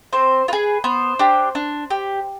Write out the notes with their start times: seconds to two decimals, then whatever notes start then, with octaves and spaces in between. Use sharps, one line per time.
0.13 C4 C5
0.48 F4 G#4 B4
0.84 B3 C5
1.19 D4 G4
1.55 D4
1.90 G4